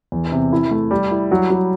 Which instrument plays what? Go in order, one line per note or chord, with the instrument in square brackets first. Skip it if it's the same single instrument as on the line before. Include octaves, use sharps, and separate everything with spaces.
[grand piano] E2
C3
E4
A3
G3
E4
F#3
F#3